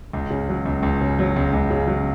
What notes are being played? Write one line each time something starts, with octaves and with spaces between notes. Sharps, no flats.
C#2
C#3
F#3
C#2
C#2
C#3
F#3
C#2
C#2
C#3
F#3